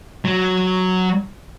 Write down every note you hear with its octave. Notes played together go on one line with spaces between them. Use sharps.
F#3